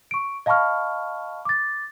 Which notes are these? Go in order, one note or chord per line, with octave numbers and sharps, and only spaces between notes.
C#6 D7
D#5 F5 A5 B5 C#6 F6
D6 A6